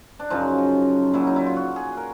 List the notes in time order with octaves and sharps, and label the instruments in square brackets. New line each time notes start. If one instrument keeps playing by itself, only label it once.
[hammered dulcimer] D4
F#2 C#3 F3 D#4
A#2 F#3 E4
D#4
E4
F4
F#4
G#4
A#4